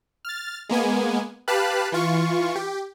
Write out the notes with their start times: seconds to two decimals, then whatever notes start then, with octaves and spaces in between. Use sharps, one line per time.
0.25 F6 A6
0.69 G#3 A#3 B3 G#5
1.48 G4 B4 F5 A5 B5 F#6
1.92 E3 F4 C#6
2.56 G4